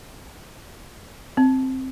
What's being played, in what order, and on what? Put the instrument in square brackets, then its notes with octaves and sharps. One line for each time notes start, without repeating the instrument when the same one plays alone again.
[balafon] C4